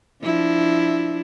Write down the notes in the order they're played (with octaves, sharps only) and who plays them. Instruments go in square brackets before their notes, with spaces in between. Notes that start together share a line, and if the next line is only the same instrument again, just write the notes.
[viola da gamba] F3 D4 E4